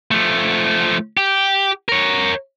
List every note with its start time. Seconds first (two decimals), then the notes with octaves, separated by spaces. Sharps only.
0.11 F3 A3
1.17 G4
1.89 A#4 C#5